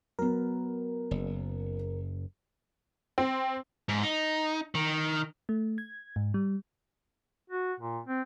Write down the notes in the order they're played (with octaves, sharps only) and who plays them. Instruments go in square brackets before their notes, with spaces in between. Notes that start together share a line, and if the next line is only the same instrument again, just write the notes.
[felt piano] F#3 B3 [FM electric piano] A#4
[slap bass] F#1
[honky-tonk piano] C4
[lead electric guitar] G#2
D#4
D#3
[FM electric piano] A3
G#6
G#2
G3
[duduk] F#4
A#2
C4